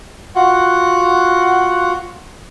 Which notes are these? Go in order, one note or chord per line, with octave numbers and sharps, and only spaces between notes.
F4 F#4 F#5